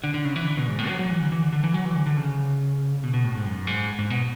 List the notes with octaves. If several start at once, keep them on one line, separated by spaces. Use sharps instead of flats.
D3
D3
C#3
E3
D3
B2
G#2
A2
F#3
F#3
E3
D3
E3
D3
D3
E3
F#3
E3
D3
D3
C#3
B2
B2
A2
G#2
F#2
G#2
G#2
B2